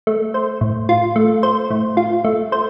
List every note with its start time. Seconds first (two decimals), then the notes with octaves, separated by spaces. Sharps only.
0.07 A3
0.34 C5
0.61 A2
0.89 F4
1.16 A3
1.43 C5
1.70 A2
1.97 F4
2.24 A3
2.52 C5